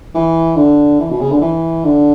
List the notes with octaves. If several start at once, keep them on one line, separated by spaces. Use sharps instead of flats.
E3
D3
E3
B2
C#3
D3
E3
D3